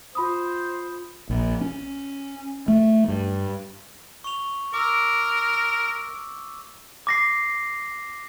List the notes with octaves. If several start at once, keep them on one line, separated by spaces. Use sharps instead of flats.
F4 C5 B5 D#6
A#1
C#4
A3
G2
C#6 F7
A#4 D6 E6
D6 A#6 C7